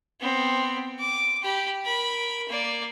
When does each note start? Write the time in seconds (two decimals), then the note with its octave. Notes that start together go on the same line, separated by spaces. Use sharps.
0.20 B3 C4
0.99 D6
1.43 G4 B5
1.85 A#4 B5
2.49 A#3 D5